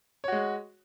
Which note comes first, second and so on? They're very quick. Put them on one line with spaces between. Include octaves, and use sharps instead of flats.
C#5 F#4 G#3